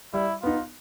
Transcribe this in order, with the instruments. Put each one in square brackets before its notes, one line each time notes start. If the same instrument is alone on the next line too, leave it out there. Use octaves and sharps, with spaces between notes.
[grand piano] G3 [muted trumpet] E4
[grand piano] B3 D#4 [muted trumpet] F4